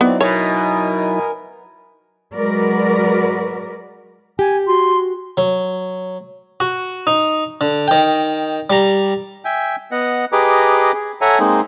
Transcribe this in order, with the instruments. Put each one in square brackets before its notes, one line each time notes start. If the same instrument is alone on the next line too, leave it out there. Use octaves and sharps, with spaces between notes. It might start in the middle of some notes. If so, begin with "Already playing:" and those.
[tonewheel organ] F#3 D#4 E4 [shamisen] B3 [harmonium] C4 D5
[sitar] B2 [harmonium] A#4 G#5 [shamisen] C#5
[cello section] F#3 G#3 F#4 A#4 B4 D5
[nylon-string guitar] G4 [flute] G#5
[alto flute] F#4 [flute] C6
[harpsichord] F#3
F#4
D#4
D3
D#3 G5
G3 A#5
[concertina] E5 G5 G#5
B3 D#5 F#5
G4 G#4 B4 D#5 A#5 D6
G#4
A4 C#5 E5 F#5 G#5 A#5
G#3 A#3 C4 D#4 G#4